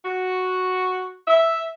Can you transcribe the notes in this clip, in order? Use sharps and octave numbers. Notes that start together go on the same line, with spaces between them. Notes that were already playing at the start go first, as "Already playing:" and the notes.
F#4
E5